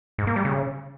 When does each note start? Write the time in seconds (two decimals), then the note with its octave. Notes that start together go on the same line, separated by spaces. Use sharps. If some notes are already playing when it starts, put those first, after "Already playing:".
0.18 G#2
0.27 A#3
0.36 G3
0.45 C#3